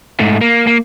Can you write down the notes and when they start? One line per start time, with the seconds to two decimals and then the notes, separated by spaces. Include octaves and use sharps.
0.20 G#2 A3
0.41 A#3
0.67 A#3